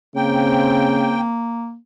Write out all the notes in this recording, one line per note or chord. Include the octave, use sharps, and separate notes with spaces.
C#3 A#3 C4 G5